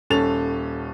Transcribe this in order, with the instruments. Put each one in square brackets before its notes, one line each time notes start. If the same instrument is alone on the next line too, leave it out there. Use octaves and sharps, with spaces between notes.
[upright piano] D#1 C#4 A4 A6 F7